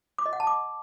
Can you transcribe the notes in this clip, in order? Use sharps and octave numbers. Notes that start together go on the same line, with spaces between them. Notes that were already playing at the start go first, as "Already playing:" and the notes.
D6
D#5
F#5
A5
D6